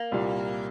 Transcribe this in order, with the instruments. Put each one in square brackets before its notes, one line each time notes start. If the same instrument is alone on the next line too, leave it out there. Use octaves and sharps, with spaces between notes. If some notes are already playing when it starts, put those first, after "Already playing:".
Already playing: [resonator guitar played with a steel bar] A#3
[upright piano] C2 A#2 G3